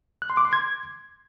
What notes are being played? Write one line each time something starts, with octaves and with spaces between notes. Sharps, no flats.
F#6
C6
D6
C6
G#6